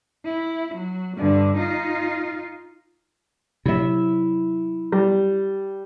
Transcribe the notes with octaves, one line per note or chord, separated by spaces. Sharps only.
E4
F#3
G2 D3
D#4 F4
C3 F#3 E4 E5
G3